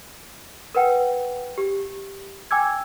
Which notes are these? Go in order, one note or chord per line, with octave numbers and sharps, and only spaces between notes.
A#4 B4 F#5 G5
G4
G5 G#5 D6 E6 G#6